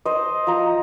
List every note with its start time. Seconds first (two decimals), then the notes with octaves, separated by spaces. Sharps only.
0.05 C5 D#5
0.47 F3 A#5